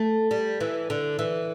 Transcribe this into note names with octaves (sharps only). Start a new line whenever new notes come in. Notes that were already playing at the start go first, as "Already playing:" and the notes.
Already playing: A3
G3
E3
D3
E3